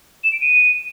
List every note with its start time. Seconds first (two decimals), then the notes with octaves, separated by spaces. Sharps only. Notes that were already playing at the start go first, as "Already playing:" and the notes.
0.24 E7
0.32 D7
0.41 D#7